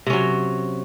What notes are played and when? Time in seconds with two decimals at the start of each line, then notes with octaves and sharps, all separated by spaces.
0.07 C3
0.10 C#4
0.13 F#3